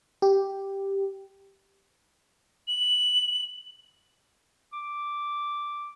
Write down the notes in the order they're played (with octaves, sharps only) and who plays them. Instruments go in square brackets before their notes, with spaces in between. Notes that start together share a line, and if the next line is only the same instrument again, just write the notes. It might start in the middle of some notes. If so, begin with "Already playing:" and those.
[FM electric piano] G4
[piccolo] F#7
[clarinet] D6